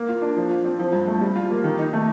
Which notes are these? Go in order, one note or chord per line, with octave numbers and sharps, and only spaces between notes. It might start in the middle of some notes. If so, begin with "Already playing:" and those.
Already playing: A#3
F4
D4
F3
F4
C4
F3
G2
A3
G3
F4
A#3
D#3
D#4
A3